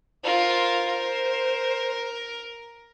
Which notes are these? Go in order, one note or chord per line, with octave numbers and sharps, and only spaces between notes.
F4 A#4 C5
A#4